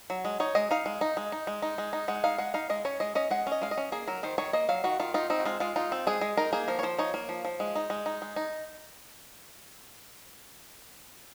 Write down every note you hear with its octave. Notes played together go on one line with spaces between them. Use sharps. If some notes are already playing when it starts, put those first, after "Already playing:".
F#3
G#3
D#4 C#5
G#3 D#5
D#4 F5
G#3
D#4
G#3
D#4
G#3
D#4
G#3
D#4
G#3 F#5
D#4 F5
G#3 F#5
D#4 F5
G#3 D#5
C#4 C#5
G#3 D#5
C#4 D#5
G#3 F#5
C#4
D#5
G#3 F5
D#5
C#4
A#3 G#4
F#3 A#4
D#3 C5
D#3 C#5
A#3 D#5
F#3 F5
D#3 F#4
D#3 F4
D#4 F4
C4 D#4
F#4
G#3 F4
G#3 F4
D#4 F4
C4
G#3 G#4
G#3
D#4 A#4
A#3 G#4
F3 A#4
C#5
F3 C5
D#4 C#5
A#3
F3
F3
G#3
D#4
G#3
D#4
G#3
D#4